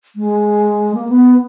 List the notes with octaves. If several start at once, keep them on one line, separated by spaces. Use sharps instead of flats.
G#3
A#3
B3